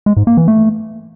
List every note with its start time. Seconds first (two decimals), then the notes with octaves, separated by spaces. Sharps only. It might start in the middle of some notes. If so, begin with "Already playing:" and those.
0.06 G#3
0.17 G#2
0.27 A#3
0.37 E3
0.48 A3